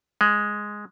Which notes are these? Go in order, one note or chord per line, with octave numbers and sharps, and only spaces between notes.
G#3